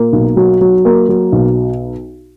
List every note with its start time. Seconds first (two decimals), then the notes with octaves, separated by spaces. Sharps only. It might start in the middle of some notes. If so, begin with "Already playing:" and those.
Already playing: A#2 A#3
0.13 B1
0.36 F#3
0.61 F#3
0.85 A#3
1.09 F#3
1.32 B1